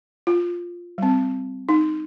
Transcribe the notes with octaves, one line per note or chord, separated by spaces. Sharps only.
F4
G3 C4
D#4